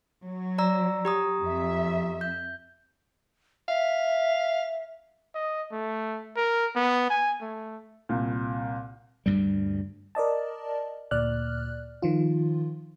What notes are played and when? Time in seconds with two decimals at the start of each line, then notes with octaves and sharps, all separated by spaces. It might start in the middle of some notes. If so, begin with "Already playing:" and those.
0.24 F#3
0.58 D5 A#5 E6
1.05 G4 A#5 D#6
1.41 F2 E5
2.21 G6
3.69 E5 F5
5.35 D#5
5.72 A3
6.37 A#4
6.76 B3
7.10 G#5
7.41 A3
8.09 C2 A#2
9.26 D2 G2 G3
10.15 A#4 D5 D#5 A5
11.11 D2 A#2 D5 F6 F#6
12.02 D#3 F3 F4